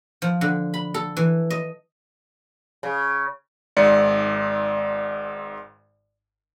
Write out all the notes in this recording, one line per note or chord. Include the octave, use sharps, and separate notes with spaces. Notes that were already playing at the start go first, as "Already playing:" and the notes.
F3
D3
B5
A4
E3
D#5
C#3
G#1 G#2 D5 C#7